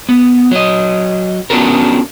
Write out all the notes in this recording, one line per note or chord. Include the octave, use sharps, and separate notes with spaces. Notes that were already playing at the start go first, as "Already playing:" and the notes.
B3
F#3 D#5
B3 C#4 D4 F#4 A4 A#4